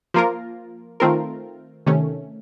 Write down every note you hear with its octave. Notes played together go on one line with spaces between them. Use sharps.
F3 A#3 F4 A#4
D#3 A3 C4 F4 A#4
C3 D#3 A3 C#4